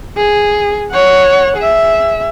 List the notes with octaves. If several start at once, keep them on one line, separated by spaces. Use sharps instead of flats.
G#4
C#5 F#5
G#4 E5